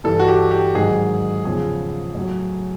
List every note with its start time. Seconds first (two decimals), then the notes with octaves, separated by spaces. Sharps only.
0.04 G2 E3 A4
0.20 F#4
0.28 G4
0.51 G4
0.75 G#2 D#3 F#3 G#4
1.45 E2 C#3 F3 G#4
2.15 A2 F#3